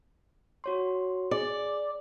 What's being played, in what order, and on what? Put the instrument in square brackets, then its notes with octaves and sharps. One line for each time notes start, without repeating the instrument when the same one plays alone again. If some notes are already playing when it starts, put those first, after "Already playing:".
[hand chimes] F#4 C#5 C6
[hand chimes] G#4 [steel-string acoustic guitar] D5